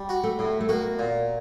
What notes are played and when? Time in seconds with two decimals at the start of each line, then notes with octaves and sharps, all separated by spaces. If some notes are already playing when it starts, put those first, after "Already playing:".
Already playing: G3
0.09 F#4
0.24 A3
0.39 A2
0.60 A3
0.69 A#3 F#4
0.99 A#2